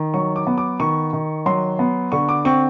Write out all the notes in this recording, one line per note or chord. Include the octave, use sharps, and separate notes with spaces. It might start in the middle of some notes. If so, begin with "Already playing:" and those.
Already playing: D#3
F#3 C#6
D6
B3
D6
D#3 C#6
D#3
F#3 C6
B3
D3 C#6
D6
C4 C#6